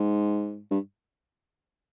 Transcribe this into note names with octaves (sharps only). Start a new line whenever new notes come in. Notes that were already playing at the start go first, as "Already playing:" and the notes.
Already playing: G#2
G2